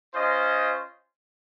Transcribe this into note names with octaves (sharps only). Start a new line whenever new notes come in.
C#4 F4 C5 D#5